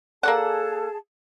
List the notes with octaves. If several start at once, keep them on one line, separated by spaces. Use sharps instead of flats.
A#3 G#4 A4 D5 F#5 A5